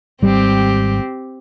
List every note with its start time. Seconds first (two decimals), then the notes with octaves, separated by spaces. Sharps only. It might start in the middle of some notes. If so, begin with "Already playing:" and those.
0.22 G#1 G3 C4 G4